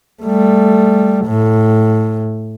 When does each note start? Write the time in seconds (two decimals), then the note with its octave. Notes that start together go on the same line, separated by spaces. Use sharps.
0.23 G3 A3
1.26 A2